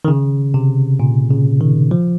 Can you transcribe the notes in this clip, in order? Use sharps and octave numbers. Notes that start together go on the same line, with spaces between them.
D#3
C#3
C3
A#2
C#3
D#3
F3